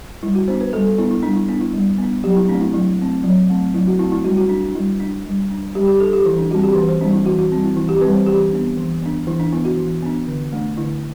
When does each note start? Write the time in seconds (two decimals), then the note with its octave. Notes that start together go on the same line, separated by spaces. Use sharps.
0.23 G3 E4
0.35 F#4
0.48 B3 D4 C5
0.61 B4
0.73 G3 A4
0.86 A4
0.98 B3 D4 E4
1.11 E4
1.23 G3 D4
1.36 E4
1.48 B3 D4
1.61 E4
1.74 G3
1.98 B3 D4
2.24 F#3 G4
2.36 E4
2.49 A3 C4 D4
2.61 E4
2.74 F#3 E4
2.99 A3 C4
3.24 F#3
3.49 A3 C4
3.74 F#3 E4
3.87 F#4
3.99 A3 C4 E4
4.12 E4
4.25 G3 F#4
4.37 F#4
4.49 D4
4.62 D4
4.75 G3 E4
5.00 D4
5.25 G3
5.50 D4
5.75 G3 G4
5.88 G4
6.00 D4 A4
6.13 G4
6.26 E3 E4
6.38 D4
6.51 G3 C4 F#4
6.63 G4
6.76 E3 B4
6.89 C5
7.01 G3 C4 D4
7.13 E4
7.26 E3 F#4
7.39 F#4
7.51 G3 C4
7.63 E4
7.76 E3 E4
7.89 G4
8.01 G3 C4 B4
8.14 C5
8.26 E3 G4
8.51 B3 D4
8.77 E3
9.02 B3 D4
9.27 E3 E4
9.40 D4
9.52 B3 D4 E4
9.65 F#4
9.77 E3
10.02 B3 D4
10.27 D3
10.53 A3 D4
10.77 D3 E4